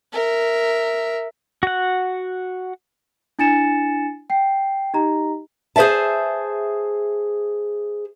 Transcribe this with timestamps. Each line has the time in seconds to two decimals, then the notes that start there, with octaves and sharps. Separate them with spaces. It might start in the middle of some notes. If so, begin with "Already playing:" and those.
0.13 A#4 E5
1.63 F#4 F#5
3.39 D4 E4 G#5 A6 C#7 E7
4.30 G5 C7
4.94 D#4 G4 D#5 A#5
5.76 G#4 C5 D5 E5 A5